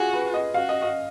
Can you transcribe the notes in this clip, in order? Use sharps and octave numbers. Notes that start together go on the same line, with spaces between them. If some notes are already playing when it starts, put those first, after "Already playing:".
Already playing: F4 F#4 G#4
B4
D#5
F#4 F5
D#5
D#5